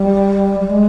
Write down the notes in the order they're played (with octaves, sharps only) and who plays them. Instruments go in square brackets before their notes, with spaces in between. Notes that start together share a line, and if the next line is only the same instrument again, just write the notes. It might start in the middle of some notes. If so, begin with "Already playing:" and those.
Already playing: [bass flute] G3
G3
G#3